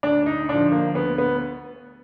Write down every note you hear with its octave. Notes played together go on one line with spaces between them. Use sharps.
D2 D4
D#4
D3 F3 D4
A#3
D2 B3
B3